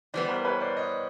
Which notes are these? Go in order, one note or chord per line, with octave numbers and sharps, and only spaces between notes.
E3 G3 B3 C5 D5
A#4 C5
B4 C#5
C5 D5
C#5 D#5